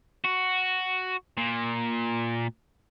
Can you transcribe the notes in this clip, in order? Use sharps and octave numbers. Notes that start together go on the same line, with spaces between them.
F#4
A#2